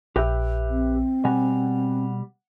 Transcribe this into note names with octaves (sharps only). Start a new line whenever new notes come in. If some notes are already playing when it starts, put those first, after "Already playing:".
A#1 G4 B4 E5 G5
C4
B2 G3 F#5 G#5